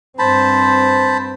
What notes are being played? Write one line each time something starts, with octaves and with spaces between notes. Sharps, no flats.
G2 C4 C5 A5 B5